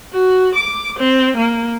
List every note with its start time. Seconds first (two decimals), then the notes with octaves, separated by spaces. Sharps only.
0.13 F#4
0.55 D6
0.99 C4
1.37 A#3